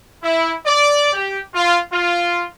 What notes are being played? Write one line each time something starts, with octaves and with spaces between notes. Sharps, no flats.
E4
D5
G4
F4
F4